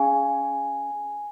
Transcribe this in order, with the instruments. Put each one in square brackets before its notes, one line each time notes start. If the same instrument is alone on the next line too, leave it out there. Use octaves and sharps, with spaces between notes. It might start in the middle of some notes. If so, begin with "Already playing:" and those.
Already playing: [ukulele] C#4 G#4 F5 [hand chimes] G#5